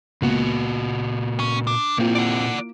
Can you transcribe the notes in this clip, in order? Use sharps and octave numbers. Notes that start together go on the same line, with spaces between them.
C#2 A#2 A#3 B3 F#4
C#4
D4
A#2 A#3 C4 E4 F4
D5 F#5